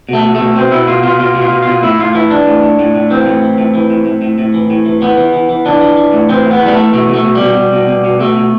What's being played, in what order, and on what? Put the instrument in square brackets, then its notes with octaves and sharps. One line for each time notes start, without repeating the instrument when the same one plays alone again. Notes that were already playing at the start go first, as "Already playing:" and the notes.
[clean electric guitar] B2 A3
B2
B2 A3
B2 C4
B2 E4
B2 F4
B2 F4
B2 F4
B2
F4
B2
B2 F4
A2 E4
A2 F4
E3 E4
E3 D4
A2
A2
A2
A2
E3 C4
A2
E3
A2
E3
A2
A2
A2
A2
E3
A2
E3
E3 B3
E3
E3
E3
E3 D4
E3
E3
A2
E3 C4
A2
B3
A2 G3
A3
E3
B2 A3
B2 A3
B2
G3
B2
B2
B2
B2
B2
B2 A3
B2